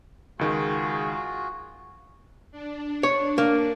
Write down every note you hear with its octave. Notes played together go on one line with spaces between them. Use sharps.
C#2 D#3 G#3 F4 F#4 G#4
D4
C#5
A#3